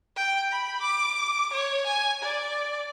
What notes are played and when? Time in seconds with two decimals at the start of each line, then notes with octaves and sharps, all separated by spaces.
0.16 G5
0.52 B5
0.81 D6
1.53 C#5
1.86 G#5
2.22 D5